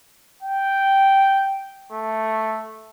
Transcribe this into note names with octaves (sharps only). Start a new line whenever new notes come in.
G5
A3